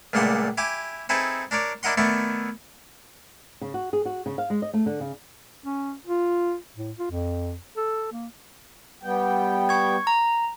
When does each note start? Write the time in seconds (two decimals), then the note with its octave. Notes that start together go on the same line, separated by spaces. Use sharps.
0.13 C#2 A#2 G3 A3 F#5 C6
0.58 E4 G4 G#5 D6
1.09 C4 D#4 E4 G#4 A4 B4
1.51 D4 A#4 C#5 D5
1.83 D4 E4 A#4 D#5 F#5 C6
1.98 D#3 A3 B3 E4 D5 C#6
3.61 C#3
3.74 F#4
3.93 G#4
4.05 F#4
4.26 C#3
4.38 F5
4.50 G#3
4.62 D#5
4.74 A3
4.86 D3
5.00 C#3
5.64 C#4
6.07 F4
6.77 A2
6.98 F4
7.11 F2
7.77 A4
8.12 A#3
9.03 G3 B3 G5
9.69 C#6 G#6
10.07 A#5